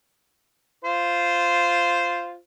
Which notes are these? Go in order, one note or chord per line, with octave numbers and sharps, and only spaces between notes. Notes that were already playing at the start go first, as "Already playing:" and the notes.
F4 C5